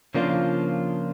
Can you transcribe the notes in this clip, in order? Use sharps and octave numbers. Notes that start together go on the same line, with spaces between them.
C#3 F3 A#3 D4 F4